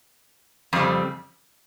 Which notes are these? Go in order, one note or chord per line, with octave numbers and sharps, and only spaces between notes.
F2 C#3 G3 C4